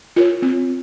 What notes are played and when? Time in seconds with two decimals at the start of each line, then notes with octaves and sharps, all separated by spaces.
0.16 F4 A#4 C#5
0.42 C4